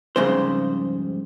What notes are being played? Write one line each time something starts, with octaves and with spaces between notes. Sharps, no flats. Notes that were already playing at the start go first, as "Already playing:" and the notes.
F2 G#2 C#3 G3 C5